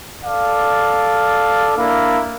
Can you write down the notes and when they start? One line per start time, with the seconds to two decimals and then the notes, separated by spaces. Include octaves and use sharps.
0.24 A4 D5 F5
1.76 A#3 D4 E4